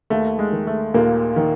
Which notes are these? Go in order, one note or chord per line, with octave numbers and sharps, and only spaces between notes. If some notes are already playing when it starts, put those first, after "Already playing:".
D#2 A3
G#3
D#3
A3
D#2 A#2 A#3
D#3